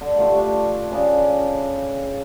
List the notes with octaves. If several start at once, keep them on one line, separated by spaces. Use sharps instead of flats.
D3
A3 F4 G4 C#6
D4
C#3 D4 G#4 G5